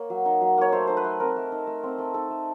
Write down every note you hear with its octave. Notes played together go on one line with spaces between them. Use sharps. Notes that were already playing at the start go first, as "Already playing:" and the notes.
Already playing: A#3 C#5
F#3
D#4
F#3
A#3 C#5
A3 C5
D#4 C5
B4
A3
C4 A#4
A3
D#4
A3
C4
A3
D#4 A4
A3